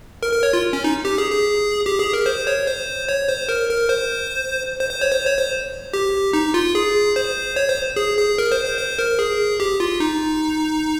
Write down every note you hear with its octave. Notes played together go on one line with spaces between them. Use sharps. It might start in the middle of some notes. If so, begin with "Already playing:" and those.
A#4
A#4
C#5
F4
C#4
D#4
G4
G#4
G#4
G4
G#4
A#4
C5
C#5
C5
C#5
C5
A#4
A#4
C5
C5
C5
C#5
C5
C#5
C5
G4
D#4
F4
G#4
C5
C#5
C5
G#4
G#4
A#4
C5
C5
C5
A#4
G#4
G4
F4
D#4